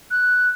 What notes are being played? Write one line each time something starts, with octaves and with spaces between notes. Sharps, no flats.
F#6